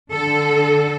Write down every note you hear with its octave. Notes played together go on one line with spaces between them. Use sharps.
D3 A4